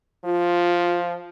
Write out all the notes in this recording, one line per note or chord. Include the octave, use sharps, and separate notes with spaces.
F3 F4